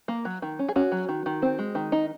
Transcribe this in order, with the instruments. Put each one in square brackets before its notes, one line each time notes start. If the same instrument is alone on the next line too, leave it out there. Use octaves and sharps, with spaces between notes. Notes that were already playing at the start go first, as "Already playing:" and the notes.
[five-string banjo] A#3
F#3
D#3
C#4
G#4
C#4 F#4
F#3
D#3
D#3
C4
G#3
D#3
D#4